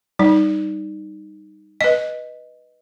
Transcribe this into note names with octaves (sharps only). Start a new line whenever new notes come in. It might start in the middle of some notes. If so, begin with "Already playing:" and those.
G3 D#4
B4 D#5